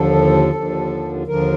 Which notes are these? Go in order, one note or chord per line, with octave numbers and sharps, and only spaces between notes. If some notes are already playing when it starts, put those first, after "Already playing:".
Already playing: D#2 D3 F3 A4
D#2 D3 F3
D#2 D3 F3 A#4